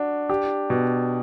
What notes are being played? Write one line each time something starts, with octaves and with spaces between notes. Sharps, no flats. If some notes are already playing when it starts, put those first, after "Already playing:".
Already playing: D4 F#4
G4
B2